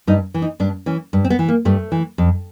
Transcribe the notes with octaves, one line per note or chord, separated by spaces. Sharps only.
G2 D#4
E3
D#4
G2 D4
E3 C#4
G2
C4
B3
E3
A#3
G2 A3
E3
F2